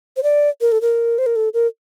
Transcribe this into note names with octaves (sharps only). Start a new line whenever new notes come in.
C5
D5
A#4
A4
A#4
C5
A#4
A4
A#4